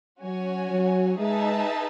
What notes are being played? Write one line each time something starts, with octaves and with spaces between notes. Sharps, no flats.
F#3 C#4 F#4 C#5 G#5
F#3
G#3 D#4 G#4 B4 E5 A5